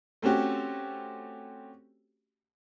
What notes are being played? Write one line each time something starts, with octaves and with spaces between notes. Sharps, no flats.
A3 C4 C#4 F#4 G4